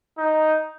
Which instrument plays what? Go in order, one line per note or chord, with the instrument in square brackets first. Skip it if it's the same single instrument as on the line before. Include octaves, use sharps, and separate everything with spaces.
[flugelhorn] D#4